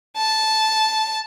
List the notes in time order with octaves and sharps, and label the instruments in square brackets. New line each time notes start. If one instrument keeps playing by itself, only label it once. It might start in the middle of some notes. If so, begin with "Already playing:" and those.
[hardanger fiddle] A5